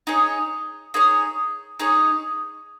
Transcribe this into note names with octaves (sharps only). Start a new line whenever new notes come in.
D#4 G#4 C#5
D#4 G#4 C#5
D#4 G#4 C#5